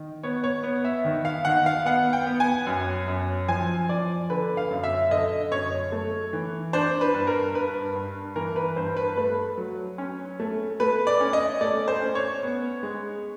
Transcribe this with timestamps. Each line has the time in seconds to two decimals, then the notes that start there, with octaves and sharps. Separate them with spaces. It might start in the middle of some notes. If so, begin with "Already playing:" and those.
Already playing: D#3
0.23 B3 C#5
0.44 C#5
0.63 B3
0.84 E5
1.05 D#3
1.25 F5
1.45 D#3 F#5
1.66 F5
1.85 B3 F#5
2.13 G5
2.26 B3
2.40 G#5
2.67 F#2
3.08 F#2
3.48 F3 G#5
3.89 F3 D5
4.30 D3 B4
4.57 F5
4.70 F#2
4.84 E5
5.11 D3 D#5
5.52 F#2 C#5
5.92 A3
6.33 E3
6.73 D4 C5
7.01 B4
7.14 G2
7.27 A#4
7.54 G2 B4
7.95 G2
8.36 E3 A#4
8.56 B4
8.76 G2 C5
8.97 B4
9.17 A3 B4
9.58 F#3
9.98 C#4
10.40 A3
10.80 A3 B4
11.07 D5
11.20 C#4
11.33 D#5
11.61 A3 D5
11.88 C5
12.01 C#4
12.15 C#5
12.43 B3
12.83 G#3